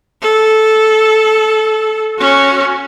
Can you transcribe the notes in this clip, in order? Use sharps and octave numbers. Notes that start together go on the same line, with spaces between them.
A4
C#4 F#4